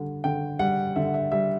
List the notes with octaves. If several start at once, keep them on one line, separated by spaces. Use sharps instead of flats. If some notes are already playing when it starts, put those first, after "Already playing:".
Already playing: D3 G3
D3 G5
G3 F#5
D3 E5
E5
G3 E5